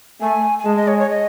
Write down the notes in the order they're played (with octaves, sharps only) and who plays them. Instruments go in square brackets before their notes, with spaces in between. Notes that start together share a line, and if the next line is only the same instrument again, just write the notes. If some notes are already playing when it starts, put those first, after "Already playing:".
[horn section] A3 [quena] G#5
[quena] G#5
[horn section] G#3 [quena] A5
[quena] D#5
C#5
C#5
D#5